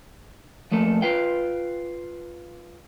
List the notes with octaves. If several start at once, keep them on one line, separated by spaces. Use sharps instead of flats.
F3 A3 A#3 A4
F4 B4 F5 G5